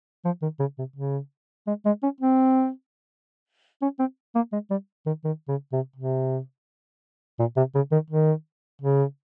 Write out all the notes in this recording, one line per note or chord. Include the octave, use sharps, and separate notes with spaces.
F3
D#3
C#3
C3
C#3
G#3
G#3
C#4
C4
C#4
C4
A#3
G#3
G3
D#3
D#3
C#3
C3
C3
A#2
C3
C#3
D#3
D#3
C#3